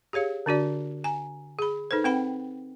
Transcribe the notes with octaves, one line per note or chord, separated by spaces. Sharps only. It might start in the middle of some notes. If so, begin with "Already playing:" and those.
G4 G#4 C#5 F5
D3 D4 F#4 D5
G#5 A#5
G#4 B5
D#4 A4 B4 C5
C4 B4 F#5 G5 B5